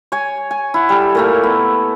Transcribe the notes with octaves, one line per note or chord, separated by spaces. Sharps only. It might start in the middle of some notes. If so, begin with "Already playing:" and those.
C#5 G#5
G#5
E4 F#5
G3 A4
A#2 A3 A#3
B3